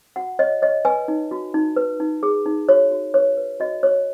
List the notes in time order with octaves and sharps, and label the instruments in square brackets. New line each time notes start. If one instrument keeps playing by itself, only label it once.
[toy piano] F#4 F#5
C#5 D#5
C#5 D#5
B4 G#5
D#4
F#4
D#4
B4
D#4
G#4
D#4
F#4 C#5
F#4
B4 C#5
B4
F#4 D#5
F#4 C#5